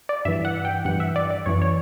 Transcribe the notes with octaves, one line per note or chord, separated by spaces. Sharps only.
D5
G2 E3 E5
F#5
G5
G2 E3 F#5
E5
D5
D5
F#2 E3 C#5
C#5